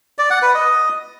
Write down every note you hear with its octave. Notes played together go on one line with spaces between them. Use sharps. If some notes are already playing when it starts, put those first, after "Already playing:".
D5
F#5
B4
D#5